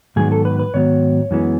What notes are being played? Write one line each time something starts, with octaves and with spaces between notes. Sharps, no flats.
G#2 D#3 F#3 B3 G#4
A4
B4
B4
G#2 D#3 F#3 B3 C#5
F#2 E3 G#3 B3